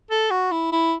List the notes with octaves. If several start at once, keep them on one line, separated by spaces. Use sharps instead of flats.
A4
F#4
E4
E4